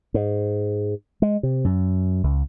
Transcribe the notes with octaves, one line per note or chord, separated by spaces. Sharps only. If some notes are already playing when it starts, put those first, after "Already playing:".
G#2
G#3
C3
F#2
C#2